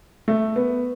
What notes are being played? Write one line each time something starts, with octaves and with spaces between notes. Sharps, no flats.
A3
B3